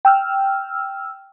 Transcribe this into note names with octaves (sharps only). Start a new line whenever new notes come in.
G5 E6 F6